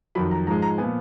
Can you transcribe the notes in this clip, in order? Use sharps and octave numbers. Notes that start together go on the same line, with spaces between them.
F2 D#3 F#3 B5
A#5
G#2 F3 G#3 A#5
A#5
A#2 F3 B3 G#5